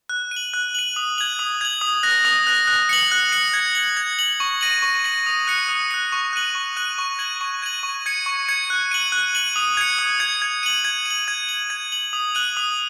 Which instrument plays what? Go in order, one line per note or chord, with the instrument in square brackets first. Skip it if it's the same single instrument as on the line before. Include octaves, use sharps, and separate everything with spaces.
[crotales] F#6
D#7
F#7
F#6
D#7 F#7
D#6
G#6 F#7
D#6
G#6 F#7
D#6
F#6 A#6
D#6
F#6 A#6
F#6
C#7 F#7
F#6
C#7 F#7
G#6
F#7
G#6
F#7
C#6
A#6 D#7 F#7
C#6
A#6 D#7 F#7
D#6
F#6 C#7
D#6
F#6 C#7
C#6
F#6 D#7 F#7
C#6
F#6 D#7 F#7
C#6
G#6 D#7 F#7
C#6
G#6 D#7 F#7
C#6
G#6 C#7
C#6
G#6 C#7
F#6
D#7 F#7
F#6
D#7 F#7
D#6
G#6 C#7
D#6
G#6 C#7
G#6
D#7 F#7
G#6
D#7 F#7
G#6
F#7
G#6
F#7
D#6
F#6 D#7 F#7
D#6